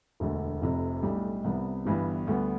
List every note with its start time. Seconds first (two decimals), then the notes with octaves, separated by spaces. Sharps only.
0.20 E1 D2 D3
0.61 F1 F2 C3
1.03 B1 A2 G3 D4 G4
1.44 C2 C3 G3 B3
1.85 G1 G2 E3 G3 B3
2.27 D2 D3 G3 B3